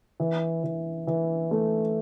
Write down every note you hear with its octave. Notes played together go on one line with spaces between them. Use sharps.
E3
E3
E3
A3